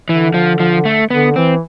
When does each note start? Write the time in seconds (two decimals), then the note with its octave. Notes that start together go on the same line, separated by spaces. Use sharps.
0.09 D3 E3
0.34 F3
0.60 F3
0.85 A3
1.10 D3 B3
1.36 E3 C4